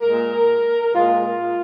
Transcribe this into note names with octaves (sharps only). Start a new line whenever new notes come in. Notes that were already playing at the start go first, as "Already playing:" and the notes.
A#2 G#3 A#4
A#2 G#3 F4